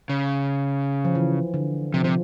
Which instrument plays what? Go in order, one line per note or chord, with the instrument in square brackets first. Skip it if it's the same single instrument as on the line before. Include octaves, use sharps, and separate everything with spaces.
[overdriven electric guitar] C#3
[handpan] F3
E3
D3
[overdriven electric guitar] C3 [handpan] F3
[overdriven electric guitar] C3 [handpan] F3